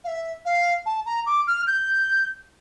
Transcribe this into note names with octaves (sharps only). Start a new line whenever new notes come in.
F5
E5
F5
A5
A#5
D6
F6
G6